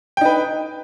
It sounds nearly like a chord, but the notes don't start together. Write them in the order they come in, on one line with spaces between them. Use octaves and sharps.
G5 D#4 B4